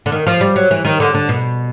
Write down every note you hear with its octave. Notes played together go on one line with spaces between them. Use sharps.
D3
D#3
F3
G3
F#3
E3
D#3
D3
D3
B2